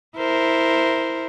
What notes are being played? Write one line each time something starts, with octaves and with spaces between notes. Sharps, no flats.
E4 A#4 C5